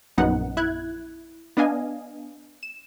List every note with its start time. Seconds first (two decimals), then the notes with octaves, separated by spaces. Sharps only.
0.18 A#1 F#2 B3 D#4 F#5
0.57 E4 F#6 G#6
1.57 B3 D4 D#5 F5 G#5
2.63 E7